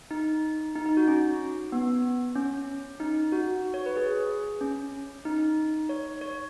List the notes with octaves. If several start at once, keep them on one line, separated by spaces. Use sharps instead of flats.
D#4
D#4
D#4
F#4
C#4
B3
C#4
D#4
F#4
C#5
B4
G#4
C#4
D#4
C#5
C#5